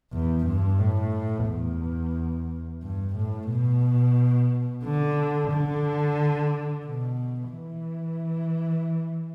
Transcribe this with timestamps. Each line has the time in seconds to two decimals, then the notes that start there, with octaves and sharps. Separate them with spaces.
0.13 E2
0.46 G2
0.79 A2
1.47 E2
2.82 G2
3.16 A2
3.50 B2
4.84 D3
5.51 D3
6.85 B2
7.53 E3